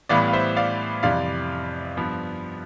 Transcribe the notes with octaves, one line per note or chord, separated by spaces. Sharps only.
A2 E3 G3 B3 D5 F5
F5
C5 E5
D5 F5
F2 C3 E3 G3 D5 F5
G2 F3 B3